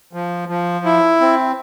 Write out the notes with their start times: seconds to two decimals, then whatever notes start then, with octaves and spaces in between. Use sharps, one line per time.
0.13 F3
0.49 F3
0.85 E4
1.21 C4